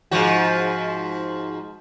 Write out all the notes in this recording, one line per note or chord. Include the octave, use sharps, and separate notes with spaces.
G#2 F3 F#4